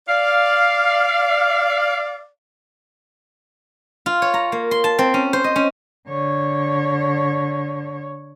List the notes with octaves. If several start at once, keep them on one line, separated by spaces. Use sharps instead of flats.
D5 F5
F4
C#5
A#5
A#3
C6
A5
C4
C#4
C5
D#5
C#4
D3 C#5